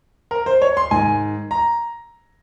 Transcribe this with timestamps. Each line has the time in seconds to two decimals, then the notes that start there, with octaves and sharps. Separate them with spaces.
0.31 A#4
0.46 C5
0.62 C#5
0.77 C6
0.91 G#2 D#3 G#5
1.51 A#5